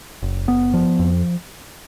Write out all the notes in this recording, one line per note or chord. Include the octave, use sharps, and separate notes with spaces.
F#1
B3
F3
F2